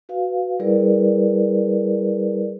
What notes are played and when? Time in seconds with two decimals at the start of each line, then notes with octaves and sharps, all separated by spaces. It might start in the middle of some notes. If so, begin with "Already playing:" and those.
0.09 F#4 B4 F5
0.59 G3 E4 G#4 A#4 B4 D5